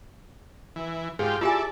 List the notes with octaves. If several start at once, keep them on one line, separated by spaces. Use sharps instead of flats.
E3
G#2 F4 G4 G#4
E4 F4 G4 A4 D5 G#5